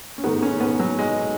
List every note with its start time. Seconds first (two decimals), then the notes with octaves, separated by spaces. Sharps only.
0.18 C#4
0.24 G#2 D#3 A3 B3
0.42 C#4
0.60 B3
0.80 F#3
0.99 G#3